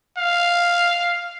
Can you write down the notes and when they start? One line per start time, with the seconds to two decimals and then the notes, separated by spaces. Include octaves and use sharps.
0.18 F5